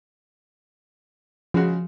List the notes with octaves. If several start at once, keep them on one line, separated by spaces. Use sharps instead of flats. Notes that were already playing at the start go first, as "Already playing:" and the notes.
C#3 F3 G#3 F#4